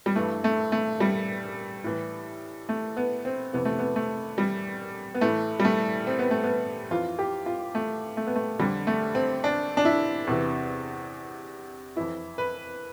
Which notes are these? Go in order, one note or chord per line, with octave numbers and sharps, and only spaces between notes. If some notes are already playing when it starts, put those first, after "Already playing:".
G3
G2 E3 A3
A3
A3
G3
A2 E3
A3
B3
C4
F2 C3 E3 B3
A3
B3
A3
G3
B3
A2 E3 A3
G3
A3
C4
B3
A3
B3
F2 E3 F4
G4
F4
A3
A3
B3
A3
F2 D3 G3
A3
C4
D4
D4
E4
E2 C3 E3
F2 E3 E4
B4